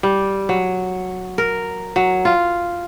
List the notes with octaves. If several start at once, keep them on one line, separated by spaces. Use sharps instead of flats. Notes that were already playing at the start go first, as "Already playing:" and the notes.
G3
F#3
A#4
F#3
F4